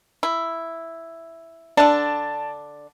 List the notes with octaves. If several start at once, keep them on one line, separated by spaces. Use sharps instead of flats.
E4
D3 D4 D5 A5